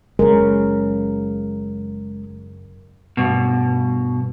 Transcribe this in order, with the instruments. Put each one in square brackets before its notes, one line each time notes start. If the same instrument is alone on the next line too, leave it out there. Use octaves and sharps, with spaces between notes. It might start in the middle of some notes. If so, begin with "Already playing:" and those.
[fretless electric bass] F#1 C#3 [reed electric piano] G#3 [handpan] A#4
[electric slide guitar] G2 B2